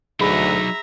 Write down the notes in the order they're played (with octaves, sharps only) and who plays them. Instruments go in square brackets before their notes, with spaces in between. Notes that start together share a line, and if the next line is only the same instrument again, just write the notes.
[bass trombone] D2 [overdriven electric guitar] F#3 D#4 [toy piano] G#4 B5 [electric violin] E5 A#5